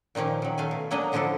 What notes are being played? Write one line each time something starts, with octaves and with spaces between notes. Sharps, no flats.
A#2 D#3 F3 A#3 C#4
D#3 F#3
A3 F5 G#5
B2
F#3 A#3 C#4 D4 D#5
A2 D3 F3 D4 E4 A4